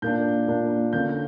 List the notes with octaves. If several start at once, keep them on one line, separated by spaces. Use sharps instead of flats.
A#2 A#3 D4 G6
A#2 A#3 D4
D3 A#3 C#4 G6
G6